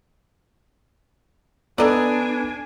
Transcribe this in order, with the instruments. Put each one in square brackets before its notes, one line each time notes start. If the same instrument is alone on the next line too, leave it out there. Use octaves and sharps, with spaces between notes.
[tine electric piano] B3 B4 [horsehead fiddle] D4 G#5 [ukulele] A4 A#5 [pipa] D5 D#5